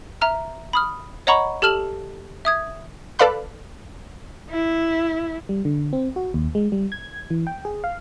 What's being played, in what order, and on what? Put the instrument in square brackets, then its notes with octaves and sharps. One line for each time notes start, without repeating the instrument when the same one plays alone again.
[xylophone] E5 A#5 F6
B5 D#6 F6
C#5 D#5 F#5 A#5 B5 C#6
G4 A4 A5 F6 E7 F#7
E5 D#6 G#6
[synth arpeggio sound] A4 B4 D5 F5 B5 F#6
[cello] E4
[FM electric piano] G3
D3
C4
F#4
D#2
G#3
G3
G#6
E3
G5
G#4
F5